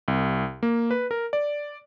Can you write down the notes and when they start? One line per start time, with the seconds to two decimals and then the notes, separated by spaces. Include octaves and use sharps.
0.08 C2
0.63 A#3
0.91 B4
1.11 A#4
1.33 D5